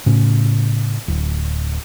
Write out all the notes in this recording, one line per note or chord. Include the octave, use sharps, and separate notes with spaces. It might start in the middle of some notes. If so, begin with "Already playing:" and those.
A2 C#3 C#4
D1